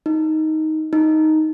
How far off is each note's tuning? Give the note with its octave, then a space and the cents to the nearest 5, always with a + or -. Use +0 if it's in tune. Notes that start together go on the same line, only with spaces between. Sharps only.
D#4 +10
D#4 +5